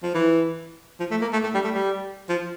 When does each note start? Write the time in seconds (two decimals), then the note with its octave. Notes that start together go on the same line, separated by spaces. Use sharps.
0.03 F3
0.14 E3
1.00 F3
1.11 A3
1.21 A#3
1.33 A3
1.43 A3
1.54 G3
1.64 A3
1.75 G3
2.29 F3